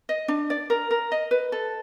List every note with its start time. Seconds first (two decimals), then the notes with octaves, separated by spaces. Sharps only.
0.09 D#5
0.28 D4
0.50 D5
0.70 A#4
0.91 A#4
1.12 D#5
1.31 B4
1.52 A4